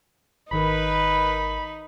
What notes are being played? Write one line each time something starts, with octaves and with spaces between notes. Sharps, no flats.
G#1 D#3 D#4 A#4 B4 B5